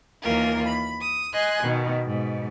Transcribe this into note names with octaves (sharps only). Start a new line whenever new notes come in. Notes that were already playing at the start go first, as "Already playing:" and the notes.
D#2 E3 A#3 F4 A#4
B5
D#6
D#5 G#5 C6 F#6
B2 D#3
G#2 B2